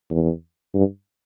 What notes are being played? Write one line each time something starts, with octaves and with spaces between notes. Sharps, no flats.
E2
G2